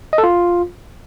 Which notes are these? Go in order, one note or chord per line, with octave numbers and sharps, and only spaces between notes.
D#5
A4
F4